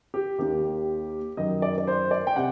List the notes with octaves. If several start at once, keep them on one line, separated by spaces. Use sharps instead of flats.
G4
D#2 D#3 G4
F#2 D#3 D#5
D5
D5
C5
D5
G5
C3 F#5